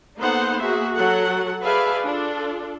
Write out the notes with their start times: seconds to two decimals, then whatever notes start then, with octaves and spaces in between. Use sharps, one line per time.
0.19 A#3 B3 D#4 A4 C5 F#5
0.60 A#3 F#4 G#4 E5
0.96 F#3 F#4 A4 F#5
1.64 G#4 B4 D5 E5 F5 A5
2.06 D4 F4 A4